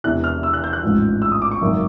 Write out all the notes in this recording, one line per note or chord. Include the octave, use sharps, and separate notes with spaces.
E1 E2 C3 E3 F#6
F6
E6
F#6
G6
F#6
A1 G#2 F3
E6
D#6
D6
C#6
G#1 F#2 C#3